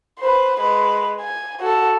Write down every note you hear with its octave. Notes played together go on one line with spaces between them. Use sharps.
B4 C5
G#3 B4
G#5
F#4 A4